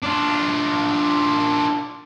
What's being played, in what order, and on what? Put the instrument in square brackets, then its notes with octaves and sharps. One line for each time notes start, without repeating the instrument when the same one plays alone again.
[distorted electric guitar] D4 F4